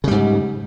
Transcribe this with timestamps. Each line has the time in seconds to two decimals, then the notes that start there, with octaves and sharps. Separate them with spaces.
0.04 C#3
0.08 G3
0.11 G#2